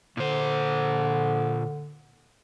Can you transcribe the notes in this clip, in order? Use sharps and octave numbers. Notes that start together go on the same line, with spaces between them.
A#2 D3 C5